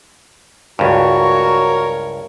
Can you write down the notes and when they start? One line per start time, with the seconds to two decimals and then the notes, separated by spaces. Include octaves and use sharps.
0.79 C#2 G2 F#3 F#4 A#4 C#5